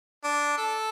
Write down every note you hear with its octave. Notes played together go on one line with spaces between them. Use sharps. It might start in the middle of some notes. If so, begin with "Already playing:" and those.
D4
A4